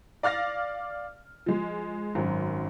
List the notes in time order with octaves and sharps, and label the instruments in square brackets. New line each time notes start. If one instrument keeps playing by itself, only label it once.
[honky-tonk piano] D5 F5 F6 A6 A#6
F3 G#3
G#1 F#2